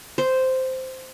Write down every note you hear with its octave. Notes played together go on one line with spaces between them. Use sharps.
C5